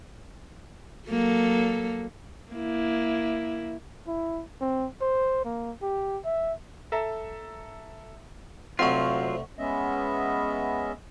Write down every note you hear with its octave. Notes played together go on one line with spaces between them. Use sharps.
F#3 A#3 A4
A#3 E4
E4
C4
C5
A#3
G4
E5
A4 E5 A#5
D2 C3 F#3 C4 F4 F5 F#5 C#6
G#3 B3 C#4 D#5 E5